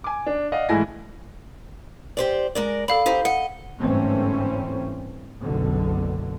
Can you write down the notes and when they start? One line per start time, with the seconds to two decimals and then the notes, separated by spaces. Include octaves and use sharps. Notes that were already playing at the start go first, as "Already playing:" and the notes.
0.04 G#5 D6
0.26 D4
0.52 D5 D#5 F5 F#5
0.69 G#2 E3 A3 E4 G#5 A#6
2.17 G4 C5 D5
2.55 G#3 A#4 D5
2.88 A4 D5 F5 B5
3.06 D#4 G4 C5
3.25 D#5 F#5
3.78 G1 G#2 E3 A3 C4 C#4
5.39 F#1 B1 D3